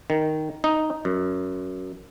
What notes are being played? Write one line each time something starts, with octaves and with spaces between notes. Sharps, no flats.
D#3
D#4
F#2